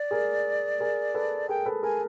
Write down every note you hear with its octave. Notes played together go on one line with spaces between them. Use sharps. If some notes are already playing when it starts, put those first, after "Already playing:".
Already playing: D5
G#4 A#4
G#4 A#4
A4 B4
G#4 A#4 G5
A4 B4
G#4 A#4 G#5